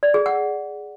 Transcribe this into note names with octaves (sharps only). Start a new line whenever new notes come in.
D5
G#4
F#5